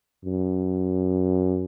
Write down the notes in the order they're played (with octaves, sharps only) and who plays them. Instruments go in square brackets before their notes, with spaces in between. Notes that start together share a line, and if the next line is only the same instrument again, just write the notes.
[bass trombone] F#2